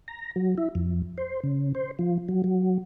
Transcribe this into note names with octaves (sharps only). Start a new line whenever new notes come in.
A#5
F#3
E4
F2
C5
C#3
C5
F3
F#3
F#3